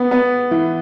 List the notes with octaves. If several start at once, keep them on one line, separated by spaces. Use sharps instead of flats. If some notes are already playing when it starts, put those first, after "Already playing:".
Already playing: B3
B3
E3